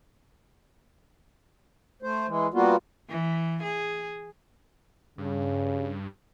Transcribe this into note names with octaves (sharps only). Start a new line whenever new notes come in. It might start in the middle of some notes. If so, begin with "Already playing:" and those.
A3 C5
E3 G#3
G3 A#3 B3 F4 F#4
E3
G#4
G2 C#3